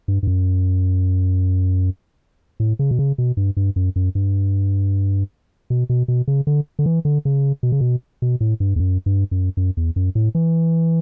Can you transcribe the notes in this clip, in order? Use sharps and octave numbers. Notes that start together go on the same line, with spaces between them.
G2
G2
F#2
A2
C#3
B2
C#3
B2
G2
G2
F#2
F#2
G2
B2
B2
B2
C#3
D3
D3
E3
D3
C#3
B2
C#3
B2
B2
A2
G2
E2
F#2
G2
F#2
F#2
E2
F#2
A2
E3